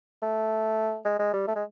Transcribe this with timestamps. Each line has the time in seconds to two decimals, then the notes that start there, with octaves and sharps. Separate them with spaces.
0.22 A3
1.05 G#3
1.19 G#3
1.33 G3
1.48 A3
1.56 G#3